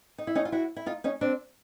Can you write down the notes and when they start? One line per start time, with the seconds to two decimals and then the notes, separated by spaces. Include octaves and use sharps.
0.18 D#4
0.27 E4
0.35 C#4 D#4
0.45 F4
0.52 E4 F#4
0.76 E4
0.86 D#4 F4
1.04 C#4 D#4
1.21 C4 D4